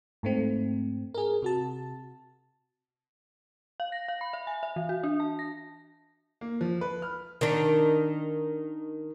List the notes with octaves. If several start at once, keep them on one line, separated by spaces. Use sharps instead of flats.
G#2 A3 C4
G#4 A#4
C3 F#4 A5
F5
A#6
F5
B5
E5
G#5
E5
E3
F#4
D4
A5
A#6
A#3
F3
B4
F6
D#3 D4